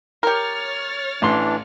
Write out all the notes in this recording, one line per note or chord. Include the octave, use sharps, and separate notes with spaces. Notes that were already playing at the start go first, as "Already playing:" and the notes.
G4 A#4 C#5 F6 A6
A1 E3 D4 C6